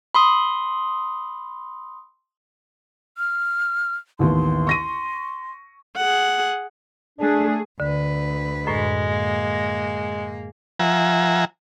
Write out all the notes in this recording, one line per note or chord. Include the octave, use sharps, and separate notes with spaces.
B5 C6 D#6
F6
A1 D#2 B3 C6
C#6 A#6 D#7
G#4 F#5
A3 D4 G#4
D2 D3 B4
F#2 A2 G#3
A#3
F3 E5 F#5 G#5 A#5